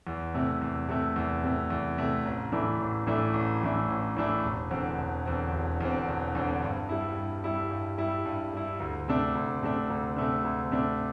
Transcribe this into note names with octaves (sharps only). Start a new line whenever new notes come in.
E2
C3 A3
E2
C3 A3
E2
C3 A3
E2
C3 A3
A1
A2 E3 A3 D4
A1
A2 E3 A3 D4
A1
A2 E3 A3 D4
A1
A2 E3 A3 D4
E1
E2 D3 C4
E1
E2 D3 C4
E1
E2 D3 C4
E1
E2 D3 C4
G2
G3 E4
G2
G3 E4
G2
G3 E4
G2
G3 E4
D2
C3 A3 D4
D2
C3 A3 D4
D2
C3 A3 D4
D2
C3 A3 D4